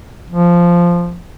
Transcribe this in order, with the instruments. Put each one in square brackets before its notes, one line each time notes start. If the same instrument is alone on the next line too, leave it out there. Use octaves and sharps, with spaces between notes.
[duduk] F3